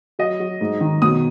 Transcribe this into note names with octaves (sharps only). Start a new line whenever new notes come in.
F#3 D#5
F#3
G#2
D#3
B2 D#6